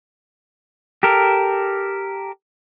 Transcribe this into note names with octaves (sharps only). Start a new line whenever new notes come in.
G4 A4 A#4